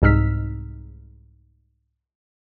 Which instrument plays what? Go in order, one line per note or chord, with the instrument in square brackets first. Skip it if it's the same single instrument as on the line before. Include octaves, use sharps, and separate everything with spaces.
[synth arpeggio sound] C2 G#2 D#4 E6 F6 B6